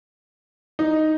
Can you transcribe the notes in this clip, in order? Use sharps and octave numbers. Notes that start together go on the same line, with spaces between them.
D#4